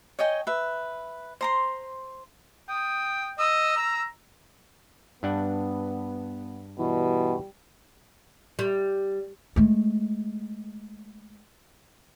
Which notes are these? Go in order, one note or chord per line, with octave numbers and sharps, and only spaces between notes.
C#5 D#5 G5 G#5
B4 E5
C5 A#5 C6
G5 D#6
D#5 E6
A#5
G2 B3 D4 F#5
B2 E3 G3 G4
G3
G#3 A3